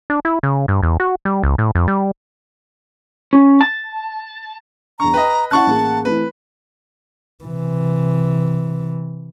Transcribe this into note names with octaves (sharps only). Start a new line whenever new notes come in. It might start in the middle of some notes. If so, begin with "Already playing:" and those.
D4
E4
C#3
G2
E2
F#4
G3
C#2
A2
F2
G3
C#4
A5
E2 D4 A#5 C#6
B4 D#5 G5
C#4 E4 F#5 A5 C#6 F#6
A1 A#3 G#4
E3 A3 C4 B4
C3 E3